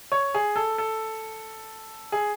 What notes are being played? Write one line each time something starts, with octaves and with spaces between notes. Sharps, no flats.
C#5
G#4
A4
A4
G#4